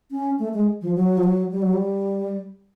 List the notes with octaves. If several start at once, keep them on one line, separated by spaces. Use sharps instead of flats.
C#4
A3
G#3
F3
F#3
F3
F#3
G3
F#3
G3